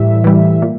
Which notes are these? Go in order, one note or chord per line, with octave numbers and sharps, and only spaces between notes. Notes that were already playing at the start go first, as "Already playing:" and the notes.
Already playing: A2 E3 G3 E5
E3 G3
A#2